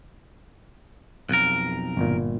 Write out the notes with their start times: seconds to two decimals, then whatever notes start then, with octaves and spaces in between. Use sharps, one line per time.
1.29 B1 F2 A#4
1.97 G1 A#2